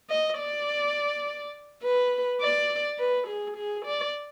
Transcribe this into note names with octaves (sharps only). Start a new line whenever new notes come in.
D#5
D5
B4
D5
B4
G#4
G#4
D5